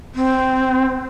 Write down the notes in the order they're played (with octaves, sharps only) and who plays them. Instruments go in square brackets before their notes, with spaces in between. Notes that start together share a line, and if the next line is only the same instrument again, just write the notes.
[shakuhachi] C4